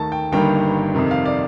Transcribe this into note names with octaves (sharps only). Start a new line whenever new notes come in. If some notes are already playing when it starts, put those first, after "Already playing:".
Already playing: D#2 D#3 A3 A5
G5
G1 G2 D#3 G3 A#3 G5
F2 C3 D#3
F5
D5